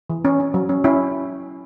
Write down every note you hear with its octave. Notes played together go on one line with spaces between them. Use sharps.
E3
C#4
C#4
F#3
C#4
C#4 E4